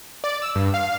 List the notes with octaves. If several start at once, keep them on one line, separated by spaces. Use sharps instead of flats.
D5
E6
G2
F5